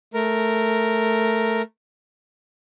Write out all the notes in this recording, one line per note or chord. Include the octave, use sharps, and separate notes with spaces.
A3 A#4